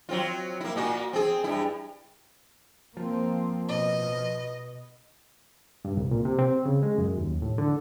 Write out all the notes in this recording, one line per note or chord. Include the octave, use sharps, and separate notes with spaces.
F#3 C4 F4
A#3 E4
A#2 A#3 F#4
C4 G#4
G2 E4
F3 A#3 C4
B2 D#5
G2
C2
A#2
C3
C4
C#3
G#3
F#2
D#2
A2
D3